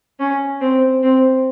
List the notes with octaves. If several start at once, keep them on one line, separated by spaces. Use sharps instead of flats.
C#4
C4
C4